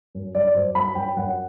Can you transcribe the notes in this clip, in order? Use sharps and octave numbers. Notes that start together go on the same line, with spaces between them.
F#2
F#2 D5
F#2 C5
F#2 B5
F#2 G5
F#2 F#5